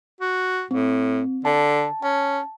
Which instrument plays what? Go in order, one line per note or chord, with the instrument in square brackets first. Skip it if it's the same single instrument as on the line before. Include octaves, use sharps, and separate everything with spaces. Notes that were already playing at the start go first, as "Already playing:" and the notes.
[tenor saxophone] F#4
[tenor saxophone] A2 [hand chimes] C4
[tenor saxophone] D3 [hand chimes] A5
[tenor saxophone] C#4 [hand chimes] A5